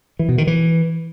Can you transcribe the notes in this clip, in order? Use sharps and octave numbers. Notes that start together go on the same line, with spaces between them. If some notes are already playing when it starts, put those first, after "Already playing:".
E3
B2
D#3
E3